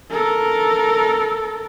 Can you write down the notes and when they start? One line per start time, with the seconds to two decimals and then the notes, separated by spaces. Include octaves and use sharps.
0.11 A4 A#4